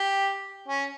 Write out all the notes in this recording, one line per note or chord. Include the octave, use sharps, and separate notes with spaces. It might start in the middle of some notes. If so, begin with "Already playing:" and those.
Already playing: G4
C#4